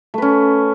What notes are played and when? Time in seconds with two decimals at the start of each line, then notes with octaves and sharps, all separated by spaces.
0.14 A3
0.18 B4
0.22 C#4